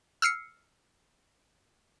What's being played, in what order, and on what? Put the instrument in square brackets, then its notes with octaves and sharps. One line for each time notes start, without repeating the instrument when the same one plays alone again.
[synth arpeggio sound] E6 F6 C7 C#7